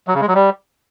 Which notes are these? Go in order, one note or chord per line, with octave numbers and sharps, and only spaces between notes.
F#3
C#3
G#3
F#3
G3